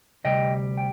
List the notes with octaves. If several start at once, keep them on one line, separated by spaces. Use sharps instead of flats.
D2 C3 G3 D#5 G5
G5